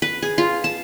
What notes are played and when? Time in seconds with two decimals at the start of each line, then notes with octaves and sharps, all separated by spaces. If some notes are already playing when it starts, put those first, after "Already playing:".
0.02 B4
0.22 G#4
0.38 F4
0.64 A5